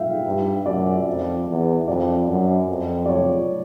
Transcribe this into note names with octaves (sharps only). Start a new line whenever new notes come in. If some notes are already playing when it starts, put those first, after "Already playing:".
Already playing: E5 F5 G5
G2
F#2 D5
F2
E2
F2 D5
F#2
F2
D5
C#5